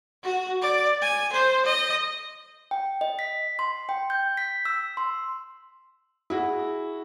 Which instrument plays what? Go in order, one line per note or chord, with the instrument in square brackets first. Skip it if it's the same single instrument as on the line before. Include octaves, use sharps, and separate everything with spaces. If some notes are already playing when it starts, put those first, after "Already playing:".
[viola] F#4
D5
G#5
C5
D#5
[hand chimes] G5
D#5
B6
C6
G5
G6
B6
E6
C6
[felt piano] E4 F#4 G#4